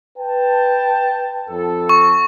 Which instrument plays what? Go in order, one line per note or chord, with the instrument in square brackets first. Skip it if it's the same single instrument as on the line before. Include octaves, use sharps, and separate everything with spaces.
[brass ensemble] B4 G5 A5
F2 A4
[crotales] C#6